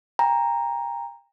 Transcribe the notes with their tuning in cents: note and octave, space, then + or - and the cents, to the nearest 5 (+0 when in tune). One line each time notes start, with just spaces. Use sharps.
G5 +35 A#5 +0